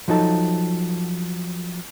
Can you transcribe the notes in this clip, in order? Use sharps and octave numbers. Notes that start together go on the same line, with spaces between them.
F3 F#3 D#4 A4